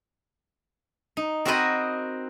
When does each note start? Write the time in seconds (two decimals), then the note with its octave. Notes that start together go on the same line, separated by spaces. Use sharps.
1.17 D#4
1.45 C4 F#4 A#4 C5 D#5 B5